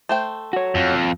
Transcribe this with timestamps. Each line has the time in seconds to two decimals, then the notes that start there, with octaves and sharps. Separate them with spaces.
0.09 A3 C5 G5
0.53 F#4 C#5
0.75 F2